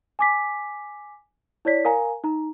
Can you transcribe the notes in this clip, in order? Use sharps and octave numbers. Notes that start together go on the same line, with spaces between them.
G#5 D6 B6
E4 C#5 D5 B6
A#4 F5 G#5 A#5
D#4 A#5